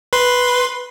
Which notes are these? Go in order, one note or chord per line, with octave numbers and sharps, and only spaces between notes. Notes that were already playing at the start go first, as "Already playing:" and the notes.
B4 C6